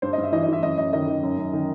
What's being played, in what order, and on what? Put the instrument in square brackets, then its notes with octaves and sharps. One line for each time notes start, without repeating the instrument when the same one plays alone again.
[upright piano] G2 C5
D#5
G2 E5
E3 D#5
D#5
E3 E5
F#2 D#5
F#2 D#5
D#3 D#5
D#3
F#2
F#2
D#3